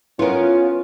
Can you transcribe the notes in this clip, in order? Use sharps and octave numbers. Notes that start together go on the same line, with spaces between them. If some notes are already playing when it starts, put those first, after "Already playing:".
B3 C#4 E4 F4 A#4